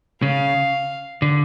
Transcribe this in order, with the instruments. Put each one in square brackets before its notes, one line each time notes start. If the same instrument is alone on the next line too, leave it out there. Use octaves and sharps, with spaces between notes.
[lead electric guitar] C#3 [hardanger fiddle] F5
[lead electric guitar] D3